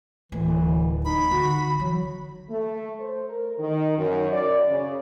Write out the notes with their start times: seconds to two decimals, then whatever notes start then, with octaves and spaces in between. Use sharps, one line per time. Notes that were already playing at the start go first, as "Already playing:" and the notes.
0.32 D1 E3
1.05 D#4 B5
1.31 D3 F#4
1.80 E3 F#3
2.50 A3
3.00 C5
3.29 A#4
3.58 D#3
3.98 F#2
4.33 D5
4.70 C#3